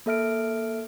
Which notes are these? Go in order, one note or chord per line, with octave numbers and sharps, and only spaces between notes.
A#3 A4 E5 F6 D7